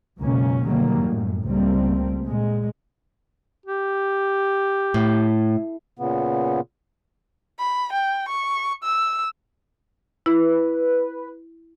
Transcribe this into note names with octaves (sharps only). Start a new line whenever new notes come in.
C#2 F#2 B2 A#3 C#4
B2 D3 D#3 F#3 G3 A#3
F#2 A2
C#2 G3 A3 A#3 C4
A#2 G#3
G4
A2
A#2 C#3 B3
B5
G5
C#6
E6
E4 B4